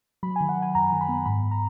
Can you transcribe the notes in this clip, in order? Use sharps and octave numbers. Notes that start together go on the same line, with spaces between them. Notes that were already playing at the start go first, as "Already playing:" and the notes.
F#3 B5
D#3 G#5
F#5
D#3 G#5
F#2 A#5
D#3
B5
B3
G#2 B5
G#2
A#5